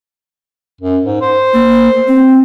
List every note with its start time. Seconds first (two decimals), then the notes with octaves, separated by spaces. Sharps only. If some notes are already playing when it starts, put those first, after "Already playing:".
0.81 F#2
1.04 G#2
1.21 C5
1.54 A#3
2.08 C4